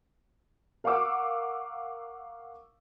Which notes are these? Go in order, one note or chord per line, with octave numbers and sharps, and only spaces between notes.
A#4 F5 F#5 C#6 D6 E6